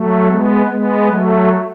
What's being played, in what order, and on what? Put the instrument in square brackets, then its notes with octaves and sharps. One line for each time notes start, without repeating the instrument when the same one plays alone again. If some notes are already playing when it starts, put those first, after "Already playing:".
Already playing: [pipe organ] F#3 A3
G#3 B3
G#3 B3
F#3 A3